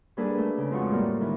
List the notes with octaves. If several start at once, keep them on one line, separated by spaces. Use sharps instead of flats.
G3 A#3 D4 G#4 A4 B4
A3
C#3
F2 F3 G#3 F4 F#4 C#6
A2 G3 A#3
D#3 E3